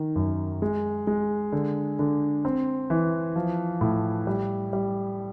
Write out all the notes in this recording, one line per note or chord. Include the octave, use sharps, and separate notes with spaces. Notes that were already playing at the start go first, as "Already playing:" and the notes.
Already playing: D#3
F#2
G#3
G#3
D3
D3
C4
E3
F3
A2
G3
G3